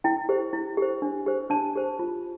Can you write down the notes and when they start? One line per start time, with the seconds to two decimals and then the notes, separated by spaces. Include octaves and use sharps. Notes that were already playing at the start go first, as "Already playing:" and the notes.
0.04 E4 G5
0.29 G4 C5
0.53 E4
0.77 G4 C5
1.02 D4
1.26 G4 C5
1.50 D4 A5
1.76 G4 C5
1.99 F4